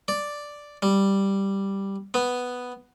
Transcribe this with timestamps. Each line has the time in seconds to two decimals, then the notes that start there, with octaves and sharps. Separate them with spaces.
0.08 D5
0.82 G3
2.14 B3